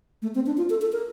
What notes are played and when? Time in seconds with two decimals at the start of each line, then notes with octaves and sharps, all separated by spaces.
0.22 A3
0.35 C4
0.46 D4
0.57 F4
0.70 A4
0.82 A4
0.92 A#4